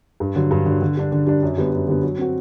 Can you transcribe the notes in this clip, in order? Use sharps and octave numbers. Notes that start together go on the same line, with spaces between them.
G2
D3 F#3
G2
D3 F#3
D3
G3 D4
D3
G3 D4
F#2
D3 G3 B3
F#2
D3 G3 B3
F#3
C4 F#4